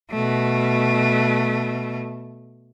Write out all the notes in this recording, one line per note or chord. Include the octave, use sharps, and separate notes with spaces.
B2 A3